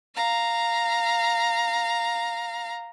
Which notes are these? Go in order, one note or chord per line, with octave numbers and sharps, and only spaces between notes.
F5 A#5